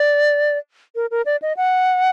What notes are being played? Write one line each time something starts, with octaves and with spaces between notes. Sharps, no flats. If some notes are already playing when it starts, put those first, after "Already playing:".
Already playing: D5
A#4
A#4
D5
D#5
F#5